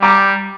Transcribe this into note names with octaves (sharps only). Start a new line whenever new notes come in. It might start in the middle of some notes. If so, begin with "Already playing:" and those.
G3 A#5 D6